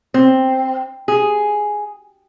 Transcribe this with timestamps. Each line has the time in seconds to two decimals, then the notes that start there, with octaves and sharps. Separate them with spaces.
0.14 C4
1.08 G#4